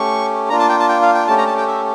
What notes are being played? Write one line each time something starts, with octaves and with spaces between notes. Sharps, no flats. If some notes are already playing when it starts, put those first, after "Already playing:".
Already playing: A3 C#4 G4 C#6
A#3 D4 F4 A#5
A5
G5
A5
G5
F5
G5
A3 C#4 G4 A5
A#5
A5
G5
E5